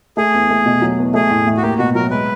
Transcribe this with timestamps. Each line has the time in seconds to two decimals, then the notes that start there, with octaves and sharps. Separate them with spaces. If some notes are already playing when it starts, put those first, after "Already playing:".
0.17 A3 G#4
0.34 E2
0.50 A3
0.66 B2
0.82 F#3
0.98 E2
1.14 A3 G#4
1.30 A2
1.47 A2
1.57 F#4
1.62 A#3 G4
1.78 B2 F#4
1.95 F#3 A#4
2.10 G#3 B4